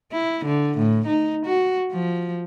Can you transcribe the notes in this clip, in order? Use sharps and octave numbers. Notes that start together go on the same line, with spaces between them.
E4
D3
A2
D#4
F#4
F3